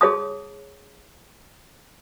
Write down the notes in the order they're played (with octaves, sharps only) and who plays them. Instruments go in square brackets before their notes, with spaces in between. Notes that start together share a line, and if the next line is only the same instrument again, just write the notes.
[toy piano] G#4 C#5 A5 D#6